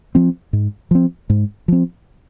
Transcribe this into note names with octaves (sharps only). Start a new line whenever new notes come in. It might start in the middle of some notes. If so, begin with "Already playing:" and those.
F3 C4
G#2
F3 C4
G#2
F3 C4